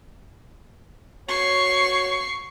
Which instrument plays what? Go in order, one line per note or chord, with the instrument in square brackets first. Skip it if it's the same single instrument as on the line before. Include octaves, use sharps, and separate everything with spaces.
[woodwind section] F#4 C#5 [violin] C#6 C7